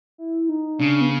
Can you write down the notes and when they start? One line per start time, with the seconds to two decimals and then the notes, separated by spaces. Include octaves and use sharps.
0.18 E4
0.49 D#4
0.80 C#3 D4
1.01 B3